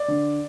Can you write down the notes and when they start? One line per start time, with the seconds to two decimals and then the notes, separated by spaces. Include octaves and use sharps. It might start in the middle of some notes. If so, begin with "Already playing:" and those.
Already playing: D5
0.08 D3